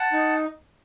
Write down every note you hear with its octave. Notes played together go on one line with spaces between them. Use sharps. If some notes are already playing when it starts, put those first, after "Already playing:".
Already playing: F#5 A5
D#4